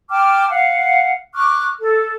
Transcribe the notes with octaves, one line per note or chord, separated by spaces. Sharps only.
G5 A5 D6 F6
F5 F#5
C#6 D6 F6 F#6
A4